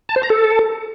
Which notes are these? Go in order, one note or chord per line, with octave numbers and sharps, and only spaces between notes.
A5
C5
A#5
A4